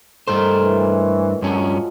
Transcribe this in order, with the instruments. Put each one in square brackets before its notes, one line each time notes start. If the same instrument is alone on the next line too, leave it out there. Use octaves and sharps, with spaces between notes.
[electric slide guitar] G2 C5 [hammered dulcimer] D#3 A#4 [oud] A3
[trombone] E3
[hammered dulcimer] C#5
[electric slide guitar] G2 C#4 [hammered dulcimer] F3 F#3 G#3